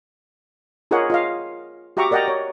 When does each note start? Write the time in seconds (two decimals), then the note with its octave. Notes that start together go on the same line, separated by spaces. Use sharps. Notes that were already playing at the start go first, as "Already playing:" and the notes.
0.91 F4 G#4 A#4 C#5 D#5 F#5
1.10 F4 D#5 F5
1.97 F#4 G4 E5 A#5 C#6 D6
2.11 A#4 D5 D#5 F#5 G5 A#5
2.28 C#5